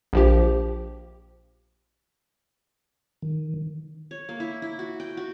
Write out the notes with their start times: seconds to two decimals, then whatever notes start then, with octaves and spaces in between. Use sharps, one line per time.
0.13 A#1 F3 G4
3.22 D#3
4.11 C#5
4.29 A#3
4.40 E4
4.62 E4
4.79 F#4
5.00 G5
5.17 F#4